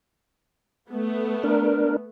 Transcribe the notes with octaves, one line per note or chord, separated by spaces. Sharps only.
A3 B3
D4 A#4